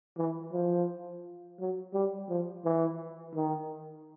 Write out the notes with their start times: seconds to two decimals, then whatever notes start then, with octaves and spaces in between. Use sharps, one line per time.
0.18 E3
0.52 F3
1.59 F#3
1.93 G3
2.29 F3
2.65 E3
3.35 D#3